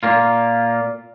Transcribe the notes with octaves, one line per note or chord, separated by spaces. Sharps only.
A#2 A#3 F4